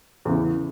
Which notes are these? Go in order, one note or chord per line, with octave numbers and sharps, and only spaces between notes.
E2 C#3 E3